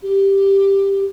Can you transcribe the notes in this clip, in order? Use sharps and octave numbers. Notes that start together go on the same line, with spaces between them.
G4